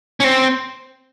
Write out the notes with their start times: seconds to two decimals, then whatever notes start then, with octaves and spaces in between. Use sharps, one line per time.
0.20 C#4
0.24 C4